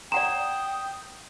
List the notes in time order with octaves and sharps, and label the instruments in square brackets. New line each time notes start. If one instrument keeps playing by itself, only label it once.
[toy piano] D5 F#5 A#5 [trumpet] G5 [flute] D#6 [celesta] E7